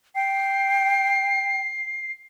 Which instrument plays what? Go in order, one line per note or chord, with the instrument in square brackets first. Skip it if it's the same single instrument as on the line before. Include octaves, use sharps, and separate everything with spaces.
[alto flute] G5 [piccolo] C7